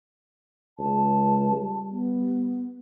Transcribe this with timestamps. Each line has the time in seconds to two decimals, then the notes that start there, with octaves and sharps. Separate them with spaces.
0.78 C#2 A5
1.52 G3
1.91 B3